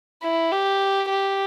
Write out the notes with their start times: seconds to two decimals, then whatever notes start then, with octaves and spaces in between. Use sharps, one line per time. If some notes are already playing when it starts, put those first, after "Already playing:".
0.23 E4
0.52 G4
1.10 G4